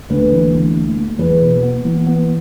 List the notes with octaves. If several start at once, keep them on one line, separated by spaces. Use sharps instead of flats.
D2 B4
E3
D2
A3
A3
E2 B4
B2
B3
E3
B3